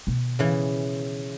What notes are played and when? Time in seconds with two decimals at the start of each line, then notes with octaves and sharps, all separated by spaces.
0.07 B2 D#3
0.39 C#3 E3